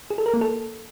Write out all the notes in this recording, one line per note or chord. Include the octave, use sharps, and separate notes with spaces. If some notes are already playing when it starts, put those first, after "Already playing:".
G#4
A4
A#4
A#3
A4